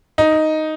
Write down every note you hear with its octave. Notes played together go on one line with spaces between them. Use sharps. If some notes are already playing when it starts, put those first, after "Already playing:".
D#4